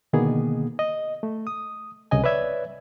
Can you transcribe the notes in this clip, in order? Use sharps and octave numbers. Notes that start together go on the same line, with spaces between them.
B2 D3 D#3 A#3 B3 G#4
D#5
A3
D#6
C2 C#3 D#5 G#5
B4 C#5 D5 E5 G#6